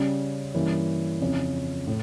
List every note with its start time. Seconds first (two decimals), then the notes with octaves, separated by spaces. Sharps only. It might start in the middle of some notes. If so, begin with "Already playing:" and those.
Already playing: C#3 G3 C#4
0.55 G2 E3 A#3 C#4
1.20 F2 C#3 F3 C#4 E4
1.87 A2